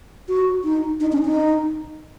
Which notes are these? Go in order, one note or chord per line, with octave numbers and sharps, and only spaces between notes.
F#4
D#4
D#4
C#4
D#4